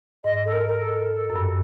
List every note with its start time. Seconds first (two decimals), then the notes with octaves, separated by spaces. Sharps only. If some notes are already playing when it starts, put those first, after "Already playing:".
0.24 G#2 D#5
0.45 A4
0.53 A#4
0.66 A#4
0.80 A4
1.30 F#2
1.36 G2